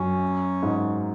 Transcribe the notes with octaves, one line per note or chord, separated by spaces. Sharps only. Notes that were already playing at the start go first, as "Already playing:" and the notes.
Already playing: F#2 C#4
G#2